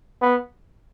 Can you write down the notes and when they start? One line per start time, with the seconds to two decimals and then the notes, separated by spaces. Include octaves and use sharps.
0.22 B3